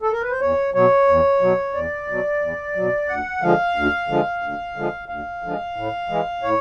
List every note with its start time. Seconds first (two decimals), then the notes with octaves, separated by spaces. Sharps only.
0.02 A4
0.12 A#4
0.22 B4
0.31 C5
0.41 E2 C#5
0.74 B2 F#3 C#5
1.08 E2
1.41 B2 F#3
1.74 E2 D5
2.08 B2 F#3
2.41 E2
2.75 B2 F#3
3.08 D2 F#5
3.42 D3 F3 G#3 F5
3.76 D2
4.08 D3 F3 G#3
4.43 D2
4.76 D3 F3 G#3
5.09 D2 F5
5.42 D3 F3 G#3
5.76 A2
6.09 E3 G#3
6.42 A2 C#5